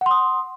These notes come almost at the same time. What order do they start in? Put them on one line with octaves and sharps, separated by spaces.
F#5 C6 D#6